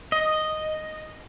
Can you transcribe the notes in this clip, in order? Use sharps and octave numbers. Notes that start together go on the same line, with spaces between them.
D#5